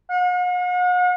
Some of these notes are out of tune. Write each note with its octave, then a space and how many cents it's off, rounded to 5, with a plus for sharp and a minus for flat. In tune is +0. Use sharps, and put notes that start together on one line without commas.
F#5 -45